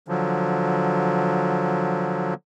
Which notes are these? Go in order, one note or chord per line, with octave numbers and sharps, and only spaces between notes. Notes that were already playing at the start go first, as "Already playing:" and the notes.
D3 F3 F#3